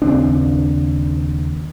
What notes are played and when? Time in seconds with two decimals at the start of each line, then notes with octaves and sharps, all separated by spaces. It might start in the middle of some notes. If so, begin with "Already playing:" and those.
0.02 D#2 C#3 C4 D4